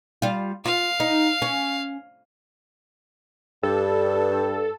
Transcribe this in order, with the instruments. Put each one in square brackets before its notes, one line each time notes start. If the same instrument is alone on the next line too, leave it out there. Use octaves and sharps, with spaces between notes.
[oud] G3 F4
[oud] F4 [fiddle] F5
[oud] D#4
C#4
[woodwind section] G2 [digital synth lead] A4